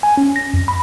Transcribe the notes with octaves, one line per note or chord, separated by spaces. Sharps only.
G#5
C#4
A#6
F2
B5